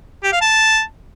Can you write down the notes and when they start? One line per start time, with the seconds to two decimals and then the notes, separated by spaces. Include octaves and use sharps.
0.24 G4
0.32 F5
0.41 A5